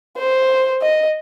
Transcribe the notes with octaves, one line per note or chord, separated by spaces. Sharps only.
C5
D#5